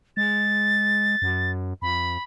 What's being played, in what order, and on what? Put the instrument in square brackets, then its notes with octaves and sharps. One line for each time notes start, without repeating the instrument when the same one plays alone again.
[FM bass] G#3 [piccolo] A6
[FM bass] F#2
[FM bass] F2 [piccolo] B5